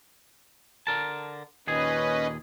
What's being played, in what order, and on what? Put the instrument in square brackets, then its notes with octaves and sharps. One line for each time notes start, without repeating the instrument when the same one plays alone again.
[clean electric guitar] D3 A#4 A5
[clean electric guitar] D#2 A#2 G#4 [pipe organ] C#4 B4 D#5